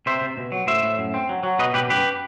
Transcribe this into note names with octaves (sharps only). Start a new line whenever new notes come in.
C3 C5 E5
C3
B2
F#3
A2 C5 E5
A2
F#2
C4
F#3
F#3
B2 B4 D#5
B2 G4 B4
F#2 G4 B4